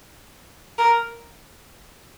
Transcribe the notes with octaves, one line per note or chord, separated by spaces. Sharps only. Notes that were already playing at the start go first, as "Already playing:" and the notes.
A#4